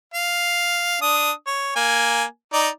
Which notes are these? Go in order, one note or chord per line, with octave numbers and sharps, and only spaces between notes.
F5
D4 D#6
C#5
A#3 G#5
D#4 D5